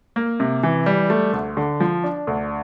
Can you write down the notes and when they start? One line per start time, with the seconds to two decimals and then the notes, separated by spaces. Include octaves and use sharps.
0.16 A#3
0.40 C3
0.63 E3
0.86 G3
1.10 A3
1.33 D2
1.57 D3
1.80 F3
2.04 D4
2.27 D2